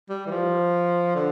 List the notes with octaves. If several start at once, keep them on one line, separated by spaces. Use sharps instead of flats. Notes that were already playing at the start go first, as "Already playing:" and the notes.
G3
E3
F3
D3